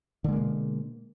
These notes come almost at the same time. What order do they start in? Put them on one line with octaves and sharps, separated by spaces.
D3 G#3 A#3 B2